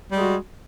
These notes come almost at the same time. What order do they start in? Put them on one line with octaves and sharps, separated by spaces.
G3 G#3 F#4